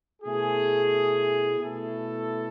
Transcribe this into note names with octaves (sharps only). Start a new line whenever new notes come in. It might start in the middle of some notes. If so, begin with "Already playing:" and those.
B2 A3 E4 G#4
B2 A3 E4 A4